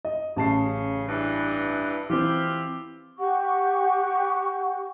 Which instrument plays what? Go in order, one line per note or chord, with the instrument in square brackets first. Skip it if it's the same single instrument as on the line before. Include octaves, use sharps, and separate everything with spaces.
[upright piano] D#5
[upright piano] A1 A5 C7 [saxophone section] C#3
[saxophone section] G2 E3
[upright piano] E3 C4 [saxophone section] E4 F4 G4
[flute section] G4 F#5 C#6